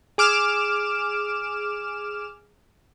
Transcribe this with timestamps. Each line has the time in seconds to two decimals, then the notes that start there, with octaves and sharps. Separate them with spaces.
0.18 G#4 D6 F6 E7